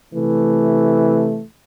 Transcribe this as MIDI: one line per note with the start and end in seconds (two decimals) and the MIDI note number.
0.14 1.43 48
0.14 1.43 52
0.14 1.43 57